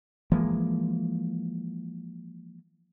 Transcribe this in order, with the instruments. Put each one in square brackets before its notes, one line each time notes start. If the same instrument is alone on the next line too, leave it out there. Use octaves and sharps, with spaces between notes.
[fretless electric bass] E3 F3 G#3 A#3